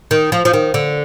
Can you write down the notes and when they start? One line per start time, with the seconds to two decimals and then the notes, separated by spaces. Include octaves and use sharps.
0.11 D#3
0.32 F3
0.45 F3
0.53 D#3
0.74 D3